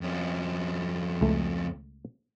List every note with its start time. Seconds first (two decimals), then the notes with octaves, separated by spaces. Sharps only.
0.01 F2 C#4
1.21 C#2 A3